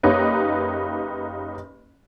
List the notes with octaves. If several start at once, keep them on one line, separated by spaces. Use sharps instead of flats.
F#1 A#3 D#4 G4 B4 C#5